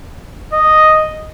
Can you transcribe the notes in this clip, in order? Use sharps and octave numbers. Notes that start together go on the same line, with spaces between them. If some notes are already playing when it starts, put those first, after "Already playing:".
D#5